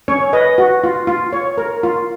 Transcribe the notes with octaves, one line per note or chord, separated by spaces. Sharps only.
C#4 C#5
B4 D#5
F#4
F4
F4
C#5
A#4
F4